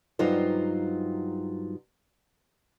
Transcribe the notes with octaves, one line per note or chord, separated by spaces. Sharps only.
G2 F#3 D#4 F4 C5